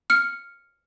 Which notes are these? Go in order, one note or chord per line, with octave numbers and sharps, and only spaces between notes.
F6 C#7